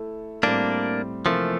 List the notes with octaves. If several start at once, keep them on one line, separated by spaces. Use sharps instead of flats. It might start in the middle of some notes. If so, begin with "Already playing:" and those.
Already playing: A3 E4 A4
A2 G3 A#3 C4 D4
C3 E3 F3 A3 A#3 F4